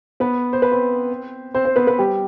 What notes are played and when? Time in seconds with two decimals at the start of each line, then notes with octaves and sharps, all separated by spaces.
0.20 B3 B4
0.53 C5
0.62 B4
0.72 C4 C5
1.54 C4 C5
1.65 C4 C5
1.76 B3 B4
1.87 B3 B4
1.99 G3 G4